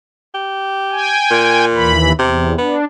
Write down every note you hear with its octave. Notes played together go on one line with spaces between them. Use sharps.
G4
G5 G#5
A#2
D#2 E3 B5
E2 C3
B3 D4